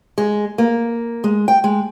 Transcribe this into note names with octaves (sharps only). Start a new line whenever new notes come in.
G#3
A#3
G#3
G5
G#3